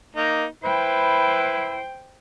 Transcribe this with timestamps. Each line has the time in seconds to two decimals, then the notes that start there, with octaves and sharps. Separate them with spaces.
0.16 A#3 D#4
0.64 E4 B4 C5 G5